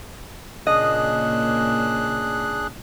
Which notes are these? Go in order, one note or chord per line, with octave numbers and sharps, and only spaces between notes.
A#2 C#3 A#3 D4 G#4 D#5 F#6